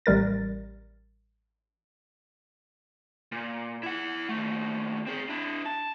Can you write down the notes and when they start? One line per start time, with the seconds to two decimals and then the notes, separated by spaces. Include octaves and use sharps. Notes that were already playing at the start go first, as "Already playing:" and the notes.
0.06 A1 G3 A#4 A6
3.32 A#2
3.83 E4 F#5
4.29 D#2 A3
5.07 C4 G#4
5.29 D4 E4
5.66 A5